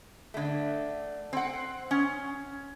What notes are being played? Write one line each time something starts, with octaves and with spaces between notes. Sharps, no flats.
D3 A3
C4 F#5
C#4